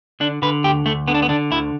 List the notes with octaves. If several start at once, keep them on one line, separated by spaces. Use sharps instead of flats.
D3 D4
D3 B4
D2 G4
D2 A3
D3 B3
D4
B3
D3 D4
D2 E4